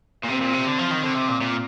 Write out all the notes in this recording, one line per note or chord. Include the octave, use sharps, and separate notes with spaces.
A#2
C3 C4
A#2
C3
D3
F3
D#3
D3 C4
C3
A#2
A#2